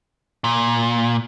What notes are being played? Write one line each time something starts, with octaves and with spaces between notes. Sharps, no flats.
A#2